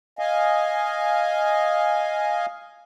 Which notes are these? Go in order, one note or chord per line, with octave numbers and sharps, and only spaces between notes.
D#5 F5 G#5